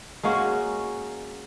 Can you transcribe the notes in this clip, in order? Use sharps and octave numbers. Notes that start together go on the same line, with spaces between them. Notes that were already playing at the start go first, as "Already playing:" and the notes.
G#3 A#3 C#4 F#4